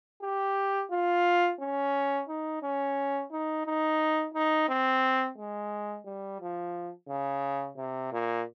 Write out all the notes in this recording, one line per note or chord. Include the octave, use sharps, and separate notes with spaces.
G4
F4
C#4
D#4
C#4
D#4
D#4
D#4
C4
G#3
G3
F3
C#3
C3
A#2